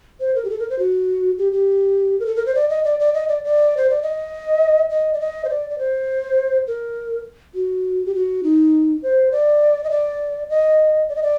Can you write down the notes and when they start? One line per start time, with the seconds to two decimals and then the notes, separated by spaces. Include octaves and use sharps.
0.20 C5
0.35 A#4
0.45 G4
0.50 A4
0.59 A#4
0.70 C5
0.79 F#4
1.38 G4
1.52 G4
2.20 A#4
2.26 A4
2.36 A#4
2.46 C5
2.55 D5
2.70 D#5
2.84 D5
3.00 D5
3.14 D#5
3.29 D5
3.44 D5
3.77 C5
3.90 D5
4.02 D#5
4.90 D#5
5.14 D5
5.20 D#5
5.45 C5
5.50 D5
5.70 D5
5.79 C5
6.67 A#4
7.55 F#4
8.06 G4
8.15 F#4
8.43 D#4
9.03 C5
9.32 D5
9.84 D#5
9.91 D5
10.49 D#5
11.09 D5
11.16 D#5
11.23 D5